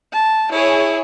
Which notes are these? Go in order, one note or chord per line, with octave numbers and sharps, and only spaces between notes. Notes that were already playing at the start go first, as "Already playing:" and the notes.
A5
E4 G#4 C#5